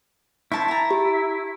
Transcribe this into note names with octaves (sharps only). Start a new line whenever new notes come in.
E4 C5 A5 C#6
A5 A#5
G4